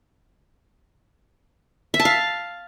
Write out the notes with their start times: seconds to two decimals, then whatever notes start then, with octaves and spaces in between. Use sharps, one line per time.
1.94 E5
2.00 A5
2.05 F5